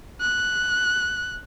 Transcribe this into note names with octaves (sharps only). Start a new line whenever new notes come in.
F#6